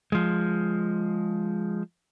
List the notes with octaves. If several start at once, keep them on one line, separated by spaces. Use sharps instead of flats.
F3 G#3